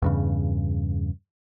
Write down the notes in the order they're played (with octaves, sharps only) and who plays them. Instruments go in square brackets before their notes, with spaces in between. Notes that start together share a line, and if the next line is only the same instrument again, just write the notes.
[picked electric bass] E2 G2 C#3